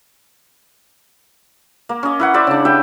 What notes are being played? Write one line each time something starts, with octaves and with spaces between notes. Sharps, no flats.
A#3
C#4 D#5
E4 B4 F#5
C5 D5 E5 B5
C#3 D4
G4 B4 E5 G5